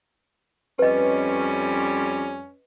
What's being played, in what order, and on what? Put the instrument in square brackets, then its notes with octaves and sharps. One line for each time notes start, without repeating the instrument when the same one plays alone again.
[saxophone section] F2 G3 C#4 [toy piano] B4 D#5